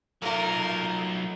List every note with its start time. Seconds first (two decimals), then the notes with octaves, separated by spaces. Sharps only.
0.22 F#3 A3 A#3 D#4 F4 A#4